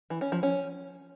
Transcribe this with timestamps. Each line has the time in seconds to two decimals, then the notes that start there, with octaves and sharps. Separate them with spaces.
0.10 E3
0.21 C#4
0.32 F3
0.43 C#4